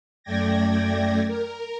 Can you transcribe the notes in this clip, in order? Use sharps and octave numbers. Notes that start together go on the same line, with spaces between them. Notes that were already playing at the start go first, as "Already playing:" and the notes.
F#2 A3 D5 G5 G#6 A#6
A#4